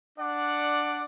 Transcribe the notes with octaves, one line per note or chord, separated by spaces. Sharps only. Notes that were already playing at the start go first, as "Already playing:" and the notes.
D4 D5 F#5